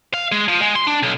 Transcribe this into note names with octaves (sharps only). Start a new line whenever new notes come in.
F5
G#3
F3
G#3
C6
D4
B1